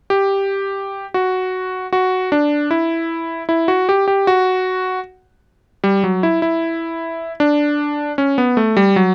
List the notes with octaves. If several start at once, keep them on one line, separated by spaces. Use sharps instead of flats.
G4
F#4
F#4
D4
E4
E4
F#4
G4
G4
F#4
G3
F#3
E4
E4
D4
C#4
B3
A3
G3
F#3